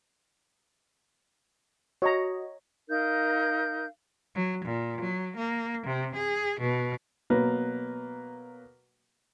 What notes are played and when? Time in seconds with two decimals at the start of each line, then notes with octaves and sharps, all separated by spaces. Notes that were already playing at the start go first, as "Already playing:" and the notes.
2.02 F#4 C#5 D#5 A#5
2.89 D#4 A#4 F5 G6
4.35 F#3
4.65 A#2
5.01 F#3
5.36 A#3
5.86 C3
6.15 G#4
6.60 B2
7.30 B2 F#3 A#3 B4